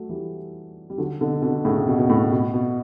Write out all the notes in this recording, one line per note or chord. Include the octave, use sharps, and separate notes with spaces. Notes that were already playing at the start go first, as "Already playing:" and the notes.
Already playing: F#3 A3
E3 G3
G3
D3 F#3
B2 D3
B2 D3
A2 C#3
B2
B2
A2
B2
B2